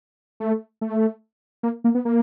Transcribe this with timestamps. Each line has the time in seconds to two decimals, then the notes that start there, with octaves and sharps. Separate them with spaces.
0.40 A3
0.81 A3
1.63 A#3
1.84 A#3
1.95 B3
2.05 A#3